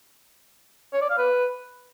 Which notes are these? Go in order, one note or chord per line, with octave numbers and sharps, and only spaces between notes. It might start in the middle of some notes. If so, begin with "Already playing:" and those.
C#5
D5
F5
B4